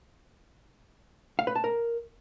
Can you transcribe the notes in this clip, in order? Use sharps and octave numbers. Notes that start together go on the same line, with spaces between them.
F5
B4
A5
A#4